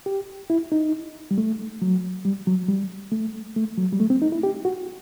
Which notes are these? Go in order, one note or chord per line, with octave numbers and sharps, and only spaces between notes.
G4
E4
D#4
G3
A3
F#3
G3
F#3
G3
A3
A3
F#3
G3
A3
C4
D#4
E4
G4
F#4